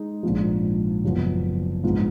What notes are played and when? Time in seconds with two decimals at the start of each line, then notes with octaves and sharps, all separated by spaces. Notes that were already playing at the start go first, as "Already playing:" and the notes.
Already playing: G#3 D#4
0.23 A#1 G#2 F3
1.04 F#1 F#2 F3 B3
1.83 A#1 G#2 F3 B3 F4